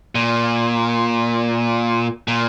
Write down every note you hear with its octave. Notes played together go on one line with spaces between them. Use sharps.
A#2
A#2